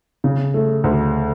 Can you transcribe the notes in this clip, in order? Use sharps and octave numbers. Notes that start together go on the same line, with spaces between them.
C#3
A3
D2